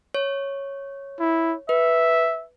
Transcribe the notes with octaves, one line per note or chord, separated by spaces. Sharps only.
C#5
E4
B4 E5